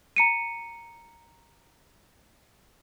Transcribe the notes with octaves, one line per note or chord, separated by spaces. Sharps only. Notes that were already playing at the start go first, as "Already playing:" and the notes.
A#5 C#7 D#7